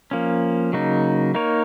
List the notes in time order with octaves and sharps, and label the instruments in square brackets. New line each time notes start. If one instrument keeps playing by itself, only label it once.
[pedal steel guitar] F3 A#3 C#4
C#3 F#3 A#3 D#4
A#3 D#4 A#4 C#5